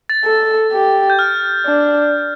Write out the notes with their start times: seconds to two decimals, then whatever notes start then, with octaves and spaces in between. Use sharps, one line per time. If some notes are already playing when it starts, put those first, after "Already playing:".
0.09 A6
0.24 A4
0.72 G4
1.10 G6
1.19 F6
1.66 D4